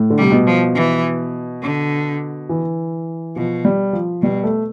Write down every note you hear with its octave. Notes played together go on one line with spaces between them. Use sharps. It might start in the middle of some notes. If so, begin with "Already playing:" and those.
Already playing: A2
D3
C3 G3
B2
F3
E3
D3
E3
B2 F3
G3
F3
B2 G3
A3